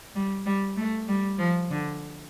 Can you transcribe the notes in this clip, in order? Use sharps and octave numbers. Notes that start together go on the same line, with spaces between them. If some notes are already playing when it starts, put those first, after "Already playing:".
G3
G3
A3
G3
F3
D3